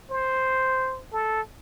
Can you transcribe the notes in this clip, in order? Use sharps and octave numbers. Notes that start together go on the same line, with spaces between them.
C5
A4